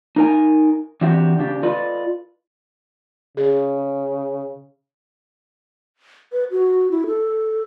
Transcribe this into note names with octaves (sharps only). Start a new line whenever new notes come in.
D#4 A#4 G#5
E3 C4 D4 F#4 G4 E5
C#3 D4 G4
F4 A4 B4 D5 D#5
C#3 G#4
B4
F#4
E4
A4